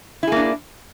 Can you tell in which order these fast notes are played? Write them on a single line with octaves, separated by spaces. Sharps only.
E4 G#4 A#3 D4